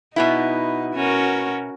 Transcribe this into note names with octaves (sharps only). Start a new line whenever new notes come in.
B2 B3 D#4 E4
C#4 F#4 A#4